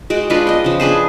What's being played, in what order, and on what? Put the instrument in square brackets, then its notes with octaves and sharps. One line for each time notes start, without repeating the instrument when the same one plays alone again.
[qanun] G#3 F#4 G5
G#3 D4 F4 B4
D#5 G5
C#3 F3
D4 G#4 B4 C5